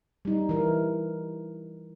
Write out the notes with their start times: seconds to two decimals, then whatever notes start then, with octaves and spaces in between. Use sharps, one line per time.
0.25 G3 D#4
0.49 E3 A#4